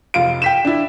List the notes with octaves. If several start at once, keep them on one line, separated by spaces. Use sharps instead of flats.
F1 F4 D7
G5 B6 E7
D4 E4